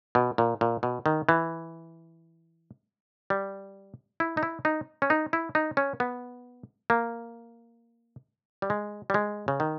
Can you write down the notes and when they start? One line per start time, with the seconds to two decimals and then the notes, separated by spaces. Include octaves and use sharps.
0.15 B2
0.38 A#2
0.61 A#2
0.83 B2
1.06 D#3
1.29 E3
3.30 G3
4.20 E4
4.37 D#4
4.43 E4
4.65 D#4
5.02 C#4
5.10 D#4
5.33 E4
5.55 D#4
5.77 C#4
6.00 B3
6.90 A#3
8.62 G3
8.70 G#3
9.10 G3
9.14 G#3
9.48 C#3
9.60 D#3